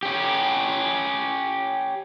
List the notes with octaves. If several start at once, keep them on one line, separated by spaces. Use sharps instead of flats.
C#4 G4